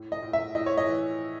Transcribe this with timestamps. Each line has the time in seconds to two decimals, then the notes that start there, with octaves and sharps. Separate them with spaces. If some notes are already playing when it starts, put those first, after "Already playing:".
Already playing: A2
0.12 D#5
0.23 A2
0.33 E5
0.55 A2 D#5
0.66 C#5
0.77 D#5
0.87 E3